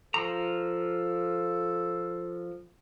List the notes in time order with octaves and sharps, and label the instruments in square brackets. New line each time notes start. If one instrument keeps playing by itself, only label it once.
[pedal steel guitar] F3 A#5 [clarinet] A4